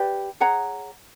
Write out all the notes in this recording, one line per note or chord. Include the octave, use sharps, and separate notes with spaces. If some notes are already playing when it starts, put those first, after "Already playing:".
Already playing: G4 B4 D5
G#4 C#5 F#5 A#5